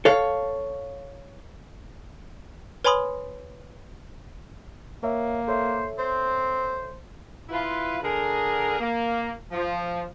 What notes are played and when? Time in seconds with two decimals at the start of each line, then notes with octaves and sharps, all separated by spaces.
0.05 A4 C#5 F5
2.85 B4 C#5 G#5 B5 C6 D#6
5.03 A#3 A#4 C#5 E5
5.48 A4 C5 C#5 E5
5.99 C4 C5
7.49 E4 F4 B4
8.02 D3 G#4 A#4
8.81 A#3
9.52 F3